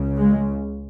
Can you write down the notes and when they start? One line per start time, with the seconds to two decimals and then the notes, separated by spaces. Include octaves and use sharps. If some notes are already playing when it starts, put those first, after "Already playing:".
Already playing: C#2 C#3
0.17 G#3